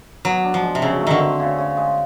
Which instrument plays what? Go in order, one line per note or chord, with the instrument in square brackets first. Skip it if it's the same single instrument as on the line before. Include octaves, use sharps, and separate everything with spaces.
[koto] F#3 [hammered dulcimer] B3
[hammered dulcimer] D4
[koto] F3
[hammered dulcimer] G#3
[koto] C3
[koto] C#3 [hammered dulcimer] F#3
[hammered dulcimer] A3
[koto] D3 D#3
[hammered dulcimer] C4
C#3
C#3
G#3